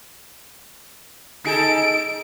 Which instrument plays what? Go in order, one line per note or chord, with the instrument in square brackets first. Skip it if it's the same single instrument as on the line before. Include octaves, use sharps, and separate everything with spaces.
[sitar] D#4 G#4 A4 [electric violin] D7